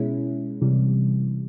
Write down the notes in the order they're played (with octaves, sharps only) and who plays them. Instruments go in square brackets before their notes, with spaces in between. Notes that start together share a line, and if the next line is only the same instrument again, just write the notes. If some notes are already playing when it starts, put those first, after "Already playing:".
Already playing: [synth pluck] B2 G#3 C#4 E4
C3 E3 G3